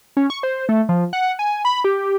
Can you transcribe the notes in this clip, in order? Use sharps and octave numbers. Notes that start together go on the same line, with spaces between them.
C#4
C#6
C5
A3
F3
F#5
G#5
B5
G4